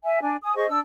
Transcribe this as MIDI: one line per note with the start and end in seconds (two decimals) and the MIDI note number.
0.03 0.20 76
0.03 0.20 80
0.21 0.36 62
0.21 0.36 80
0.42 0.55 80
0.42 0.55 87
0.55 0.67 68
0.55 0.67 72
0.55 0.67 75
0.55 0.67 85
0.68 0.78 62
0.68 0.78 88